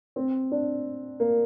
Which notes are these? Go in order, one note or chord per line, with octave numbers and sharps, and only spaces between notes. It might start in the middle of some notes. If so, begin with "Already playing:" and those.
C4
D4
A#3